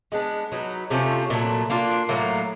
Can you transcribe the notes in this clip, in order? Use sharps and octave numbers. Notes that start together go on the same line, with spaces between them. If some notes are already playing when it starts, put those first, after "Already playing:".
G#3 B3 D4
F#3 B3 D#4
C3 F3 A3 C#4
A#2 F#3 A3
A#3 D4 F4
A2 F#3 A#3